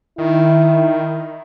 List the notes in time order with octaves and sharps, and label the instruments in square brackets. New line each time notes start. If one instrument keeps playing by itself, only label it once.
[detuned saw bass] D#3 [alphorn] E4